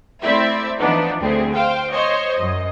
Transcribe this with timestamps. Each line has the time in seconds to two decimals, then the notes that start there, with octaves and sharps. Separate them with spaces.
0.23 A3 C4 E4 D5 E5
0.78 E3 F3 B3 D4 D#4
1.22 D2 C4 G#4
1.55 C5 F5 G5
1.91 C5 C#5 D#5
2.35 F#2 D#5